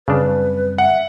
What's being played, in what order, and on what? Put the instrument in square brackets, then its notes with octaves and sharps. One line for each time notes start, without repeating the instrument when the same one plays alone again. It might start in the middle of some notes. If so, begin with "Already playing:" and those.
[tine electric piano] F#2 G3 C4 [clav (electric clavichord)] C#3 D4 [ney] B4
[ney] E5 [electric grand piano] F#5